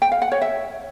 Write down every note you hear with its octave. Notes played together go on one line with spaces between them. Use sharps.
G5
F5
F#5
C#5
E5